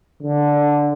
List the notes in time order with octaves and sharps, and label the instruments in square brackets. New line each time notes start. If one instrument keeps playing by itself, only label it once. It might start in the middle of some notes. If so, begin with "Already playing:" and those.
[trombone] D3